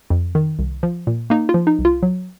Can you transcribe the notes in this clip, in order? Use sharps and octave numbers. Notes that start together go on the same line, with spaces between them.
F2
D#3
C2
F3
A#2
A#3 D#4
F4
F3
D#4
C2
F4
F#3